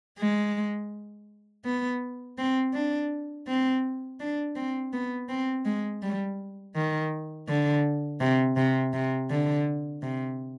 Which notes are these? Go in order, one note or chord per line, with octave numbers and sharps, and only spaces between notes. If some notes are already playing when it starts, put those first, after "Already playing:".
G#3
B3
C4
D4
C4
D4
C4
B3
C4
G#3
G3
D#3
D3
C3
C3
C3
D3
C3